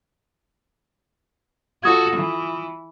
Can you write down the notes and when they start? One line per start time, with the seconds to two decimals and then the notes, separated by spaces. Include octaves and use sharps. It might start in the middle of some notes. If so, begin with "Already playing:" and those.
1.83 F4 F#4 A4 D#6 G#6
2.15 E3